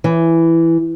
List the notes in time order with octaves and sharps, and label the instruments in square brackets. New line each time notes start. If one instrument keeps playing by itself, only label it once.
[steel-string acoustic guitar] E3